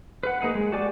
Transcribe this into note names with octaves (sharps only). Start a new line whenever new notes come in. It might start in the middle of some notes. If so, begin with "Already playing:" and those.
B4 F#5
A#3 D#4 G#4 F#5
G#3
F#4 G4 D5 G#5 D6